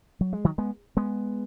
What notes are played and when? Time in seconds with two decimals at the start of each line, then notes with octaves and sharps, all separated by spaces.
0.21 F#3
0.33 G#3
0.44 D#3 F#3
0.58 G#3 B3
0.97 G#3 B3